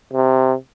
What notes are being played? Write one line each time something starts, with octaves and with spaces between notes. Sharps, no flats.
C3